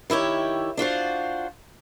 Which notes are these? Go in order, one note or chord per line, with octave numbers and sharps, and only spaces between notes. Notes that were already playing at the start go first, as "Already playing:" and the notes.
D#3 E4 G4 C#5
D4 F4 F#4 C5